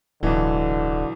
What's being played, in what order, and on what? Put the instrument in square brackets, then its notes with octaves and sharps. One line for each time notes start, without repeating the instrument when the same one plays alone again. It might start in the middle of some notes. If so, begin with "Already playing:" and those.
[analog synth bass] D1 [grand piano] B1 E3 [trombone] D3